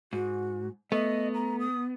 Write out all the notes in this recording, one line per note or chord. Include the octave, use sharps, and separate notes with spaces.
G#2 F#4
A3 B3 D#5
A#5
D#6